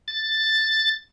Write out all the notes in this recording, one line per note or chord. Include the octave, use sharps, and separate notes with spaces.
A6